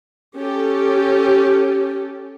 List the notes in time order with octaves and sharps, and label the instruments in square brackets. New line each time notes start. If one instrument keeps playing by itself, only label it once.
[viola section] C#4 G4 A4